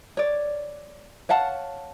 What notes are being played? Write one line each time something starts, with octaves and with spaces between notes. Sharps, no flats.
C#5 D5
C#5 F5 F#5 A5